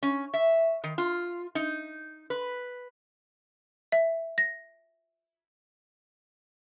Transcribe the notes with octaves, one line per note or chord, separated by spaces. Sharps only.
C#4
E5
D#3
F4
D#4
B4
E5
A#6